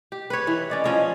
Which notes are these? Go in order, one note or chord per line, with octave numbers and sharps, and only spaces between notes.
G4
B4 C#5
E3
C#4 D5 D#5
F3 C#4 D#5